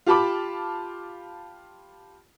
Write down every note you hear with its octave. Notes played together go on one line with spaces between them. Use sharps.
F4 G4 A5 B5 D6